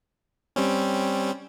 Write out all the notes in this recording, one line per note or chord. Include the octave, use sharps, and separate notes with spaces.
G3 C4 C#4